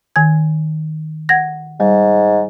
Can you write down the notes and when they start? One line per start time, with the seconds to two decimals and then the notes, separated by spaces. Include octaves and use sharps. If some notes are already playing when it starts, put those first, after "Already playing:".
0.16 D#3 G#5 G#6
1.29 F#5 G#6 A#6
1.80 G#2 G3